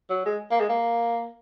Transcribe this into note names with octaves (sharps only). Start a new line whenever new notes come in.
F#3
G#3
A#3
G#3
A#3